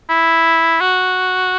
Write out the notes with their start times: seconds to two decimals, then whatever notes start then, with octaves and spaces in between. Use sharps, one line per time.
0.09 E4
0.81 F#4